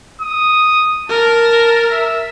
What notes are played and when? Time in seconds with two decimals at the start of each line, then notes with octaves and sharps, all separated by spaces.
0.21 D#6
1.09 A#4 A5
1.91 E5